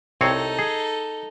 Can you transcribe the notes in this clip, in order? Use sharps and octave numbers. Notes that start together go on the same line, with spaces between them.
C2 C4 D#4 A4 C#5
G#4